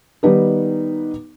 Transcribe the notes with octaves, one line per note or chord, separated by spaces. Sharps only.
D#3 G3 B3 D#4 B4